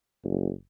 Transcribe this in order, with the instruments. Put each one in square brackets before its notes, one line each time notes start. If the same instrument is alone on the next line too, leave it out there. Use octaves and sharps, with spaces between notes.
[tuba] F#1